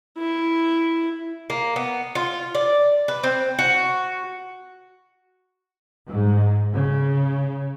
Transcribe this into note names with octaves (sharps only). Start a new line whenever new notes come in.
E4
A#3
B3
F4
D5
B4
C4
F#4
G#2
C#3